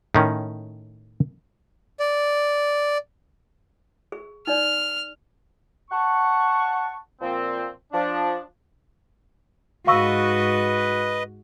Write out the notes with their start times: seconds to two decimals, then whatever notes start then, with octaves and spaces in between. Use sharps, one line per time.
0.15 A2 D#3 C#4
2.00 D5
4.12 G#4
4.47 D#4 D5 F6
5.91 F#5 A5 C#6
7.21 A#2 F3 C4
7.93 F3 D4
9.87 G#2 F#4 B4 D#5 F5 C#6 E6